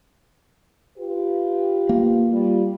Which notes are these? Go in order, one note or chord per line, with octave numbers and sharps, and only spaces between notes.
F4 G4 B4
A#3
G3 F4